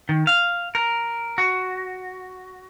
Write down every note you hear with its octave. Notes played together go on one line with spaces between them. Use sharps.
D#3
F5
A#4
F#4